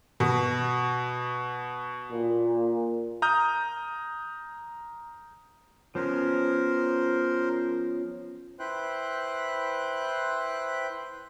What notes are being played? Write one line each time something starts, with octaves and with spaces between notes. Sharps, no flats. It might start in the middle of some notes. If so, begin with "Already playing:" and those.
B2
A#2
A#5 D#6 F6 G6
F3 B3 C#4 A#4 C5
E4 B4 C5 G5 F#6